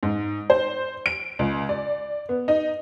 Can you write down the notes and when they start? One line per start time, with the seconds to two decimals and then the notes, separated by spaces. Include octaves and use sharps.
0.03 G#2
0.50 C5
1.06 D7
1.39 C#2
1.69 D5
2.29 B3
2.48 D#4